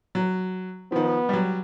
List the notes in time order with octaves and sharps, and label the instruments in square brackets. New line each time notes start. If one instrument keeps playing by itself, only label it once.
[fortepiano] F#3
[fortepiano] D#3 F3 [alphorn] B3
[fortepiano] F#3 G3